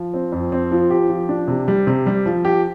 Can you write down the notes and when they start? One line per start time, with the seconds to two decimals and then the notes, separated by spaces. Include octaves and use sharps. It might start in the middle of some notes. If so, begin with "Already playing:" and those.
Already playing: F3
0.14 C4
0.32 F2
0.52 C4
0.72 F3
0.90 G4
1.09 F3
1.29 D4
1.48 C3
1.68 G3
1.87 C3
2.06 G3
2.26 F3
2.45 G4